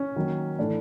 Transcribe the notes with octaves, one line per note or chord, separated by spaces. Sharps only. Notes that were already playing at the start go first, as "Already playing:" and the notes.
Already playing: C#4
D#3 F#3 A#3
A2 E3 A3 D4